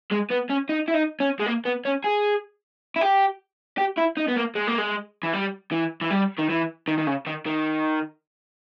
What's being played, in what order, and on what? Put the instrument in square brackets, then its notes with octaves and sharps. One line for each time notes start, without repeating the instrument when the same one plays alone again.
[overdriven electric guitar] G#3
B3
C#4
D#4
E4
D#4
C#4
G#3
A#3
B3
C#4
G#4
E4
G4
G4
E4
D#4
B3
A#3
G#3
A#3
G#3
E3
G3
E3
E3
G3
D#3
E3
D#3
D#3
C#3
D#3
D#3